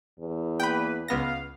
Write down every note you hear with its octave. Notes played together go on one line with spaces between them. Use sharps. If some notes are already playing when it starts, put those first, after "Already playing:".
E2
A#3 B4 G5 B5
C#2 B3 F5 A#6